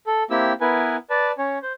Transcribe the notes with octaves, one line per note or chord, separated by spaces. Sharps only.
A4
A#3 C4 E4 G4 E6
B3 E4 A#4 B4 G#5
B4 D5 A5
C#4 C#5
C5